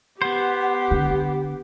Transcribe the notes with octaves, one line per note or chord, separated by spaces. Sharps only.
B3 G4 C5 F#5
D3